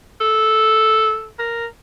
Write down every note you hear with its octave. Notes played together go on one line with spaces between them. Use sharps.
A4
A#4